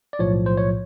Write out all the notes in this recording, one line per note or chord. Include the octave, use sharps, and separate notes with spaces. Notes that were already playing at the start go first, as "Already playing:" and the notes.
D5
B1 A2 F3 C#5
C5
C#5